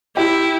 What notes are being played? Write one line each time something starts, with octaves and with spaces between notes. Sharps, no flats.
E4 G4